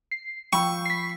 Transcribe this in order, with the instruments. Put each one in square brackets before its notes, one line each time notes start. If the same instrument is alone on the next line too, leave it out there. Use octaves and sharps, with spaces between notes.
[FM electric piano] C7
[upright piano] F3 B5 E6 [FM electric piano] G5 [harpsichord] C#6
[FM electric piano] B6 C7